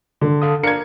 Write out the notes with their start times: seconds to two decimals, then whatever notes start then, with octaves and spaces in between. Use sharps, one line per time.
0.21 D3
0.42 A4 F5 D#6
0.63 D4 A#4 F5 G#6 C#7